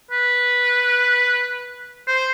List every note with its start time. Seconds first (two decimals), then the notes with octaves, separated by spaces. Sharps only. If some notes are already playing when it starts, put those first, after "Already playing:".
0.11 B4
2.07 C5